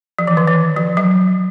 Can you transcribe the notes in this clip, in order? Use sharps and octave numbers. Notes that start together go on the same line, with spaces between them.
F3
E3
D#3
E3
F3
F#3